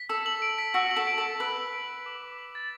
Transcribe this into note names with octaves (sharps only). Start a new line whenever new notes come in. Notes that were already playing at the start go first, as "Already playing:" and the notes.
Already playing: B6
A4 E6
F#7
D7
B6
F#4 E6
F#7
A4
D7
A4
B6
B4 E6
F#7
D7
B6
D6
D6
F#7
A6